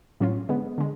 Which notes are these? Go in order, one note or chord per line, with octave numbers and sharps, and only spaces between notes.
A2 F#3 C#4 F4
D3 G#3 B3
D3 G#3